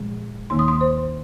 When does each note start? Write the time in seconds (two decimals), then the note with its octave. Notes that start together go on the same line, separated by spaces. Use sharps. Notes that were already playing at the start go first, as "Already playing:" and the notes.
Already playing: A#2 F3 G#3
0.50 D#2 D#3 A#3 D#4 C6
0.59 D#6
0.68 C6
0.81 C5